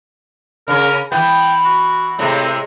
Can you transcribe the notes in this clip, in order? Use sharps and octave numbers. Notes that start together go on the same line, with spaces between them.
C#3 C#4 A#4
E3 B3 G5
F#4
A2 C3 G#3 C4